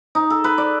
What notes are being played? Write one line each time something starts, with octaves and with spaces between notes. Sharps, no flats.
D#4
A4
B4
D5